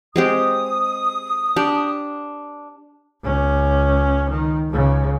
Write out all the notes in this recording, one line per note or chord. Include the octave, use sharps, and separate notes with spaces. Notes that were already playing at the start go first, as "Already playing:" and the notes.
G#3 C4 G4 D#6
D4 G4
C#2 C#4
D#3
C#2 C#3